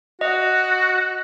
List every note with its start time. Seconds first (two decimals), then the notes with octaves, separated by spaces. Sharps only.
0.21 F#4 D#5